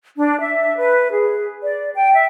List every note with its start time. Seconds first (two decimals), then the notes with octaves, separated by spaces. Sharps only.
0.16 D4
0.39 E5
0.77 B4
1.12 G#4
1.62 D5
1.95 G5
2.14 E5